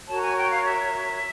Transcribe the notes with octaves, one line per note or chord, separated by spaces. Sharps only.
F#4 A#4 C#5 A5
G#5
G5
F5
E5